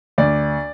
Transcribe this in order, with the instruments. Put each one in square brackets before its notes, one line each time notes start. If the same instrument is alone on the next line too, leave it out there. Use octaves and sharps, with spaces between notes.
[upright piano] D2 D5